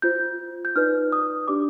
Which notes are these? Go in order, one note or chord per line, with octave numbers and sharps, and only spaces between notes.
F4 C5 G6
G6
D#4 B4 D5 F6
D#6
D4 G4 D5 D6